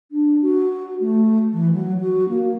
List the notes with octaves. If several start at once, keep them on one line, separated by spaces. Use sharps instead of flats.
D4
F#4
A3
E3
F#3
F#4
A#3